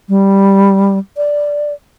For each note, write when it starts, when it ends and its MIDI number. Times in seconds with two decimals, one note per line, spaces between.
0.09 0.98 55
1.17 1.73 74